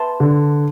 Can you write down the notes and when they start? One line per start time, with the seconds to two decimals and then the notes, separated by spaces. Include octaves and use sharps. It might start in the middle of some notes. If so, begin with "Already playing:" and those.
Already playing: B4 E5 A5 C6
0.20 D3